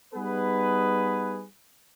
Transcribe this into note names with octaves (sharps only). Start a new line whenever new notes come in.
G3 B3 D#4 G#4 B4